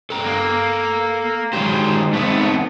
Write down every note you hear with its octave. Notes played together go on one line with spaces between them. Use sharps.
A4 G5 A#5
A#3
D#3 F#3 G#3 G4 C5
G#3 A3 B3 C4 D#4